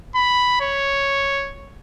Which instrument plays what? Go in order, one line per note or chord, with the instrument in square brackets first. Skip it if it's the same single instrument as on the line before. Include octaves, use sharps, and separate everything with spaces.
[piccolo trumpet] B5
C#5